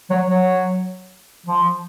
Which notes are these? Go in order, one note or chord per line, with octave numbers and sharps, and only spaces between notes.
F#3
F#3
F3